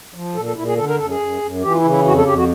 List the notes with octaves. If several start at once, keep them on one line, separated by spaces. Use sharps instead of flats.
F3
A#2 A4
A4
A#2 E4
G#4
D3 A4
A#4
F#2 A4
G#4
F#2
F#2
E3 G4
F4
E4
C#3
E4
F2 F#4
A4
F2 G4
F#4